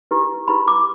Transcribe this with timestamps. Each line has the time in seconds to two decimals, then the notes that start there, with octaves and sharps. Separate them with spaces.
0.11 E4 G4 B4
0.48 E4 G4 B4 B5
0.68 D6